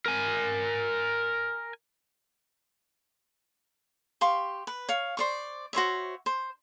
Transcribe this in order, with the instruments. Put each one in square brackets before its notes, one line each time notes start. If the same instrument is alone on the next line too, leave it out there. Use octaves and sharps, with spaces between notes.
[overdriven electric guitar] A#4 G#5
[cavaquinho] G4 F5 C6 C#6
B4
C#5 F5
C5 D5 C#6
F#4 C5 C#5 E5
C5